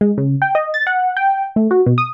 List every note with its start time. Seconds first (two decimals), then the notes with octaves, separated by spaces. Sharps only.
0.01 G#3
0.18 C#3
0.42 G5
0.55 D#5
0.74 A6
0.87 F#5
1.17 G5
1.56 A3
1.71 F#4
1.86 B2
1.98 D#6